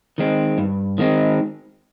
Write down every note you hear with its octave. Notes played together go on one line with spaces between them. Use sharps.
D#3 G#3 C4
G2
D#3 G#3 C4